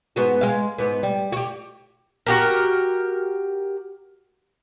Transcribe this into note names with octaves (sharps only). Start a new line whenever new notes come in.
G#2 B3 F#4
G#3 F5
G#2 B3
G3
F#4 G4
F#4 G4 A#4